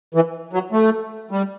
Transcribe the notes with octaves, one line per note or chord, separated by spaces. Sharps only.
E3
F#3
A3
G3